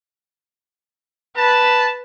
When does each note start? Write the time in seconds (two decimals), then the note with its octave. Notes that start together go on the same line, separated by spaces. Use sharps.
1.37 B4 A5